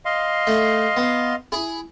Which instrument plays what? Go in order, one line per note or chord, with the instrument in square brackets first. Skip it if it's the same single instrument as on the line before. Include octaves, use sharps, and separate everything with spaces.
[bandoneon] D#5 F5 C6
[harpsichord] A3 E5
B3
E4 G#4